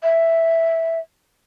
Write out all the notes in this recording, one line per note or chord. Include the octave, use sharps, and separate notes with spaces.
E5